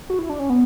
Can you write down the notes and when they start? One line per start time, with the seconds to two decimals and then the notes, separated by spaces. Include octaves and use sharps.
0.10 F#4
0.19 E4
0.29 D4
0.39 C#4
0.50 B3